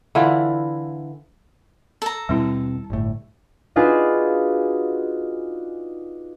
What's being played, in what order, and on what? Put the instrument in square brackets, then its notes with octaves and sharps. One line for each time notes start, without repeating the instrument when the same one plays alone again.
[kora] D3 E3 E4 F4
[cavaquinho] A4 A#5
[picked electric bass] D#2 B2 C4 [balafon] G3 E4
[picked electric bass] G1 A2
[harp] D4 D#4 F4 F#4 G#4 B4